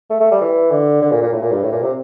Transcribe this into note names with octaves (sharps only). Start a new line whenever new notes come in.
A3
A3
G3
E3
D3
D3
A#2
A#2
A2
A#2
G2
A2
A#2
C3